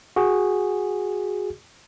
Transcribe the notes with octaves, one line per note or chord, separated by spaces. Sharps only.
F#4 G#4